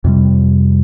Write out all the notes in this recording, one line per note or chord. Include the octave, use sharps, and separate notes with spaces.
F2 C3 G3